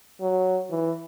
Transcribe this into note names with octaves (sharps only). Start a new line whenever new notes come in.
F#3
E3